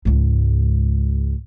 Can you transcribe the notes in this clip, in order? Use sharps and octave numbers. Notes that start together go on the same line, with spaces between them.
C#2 G#2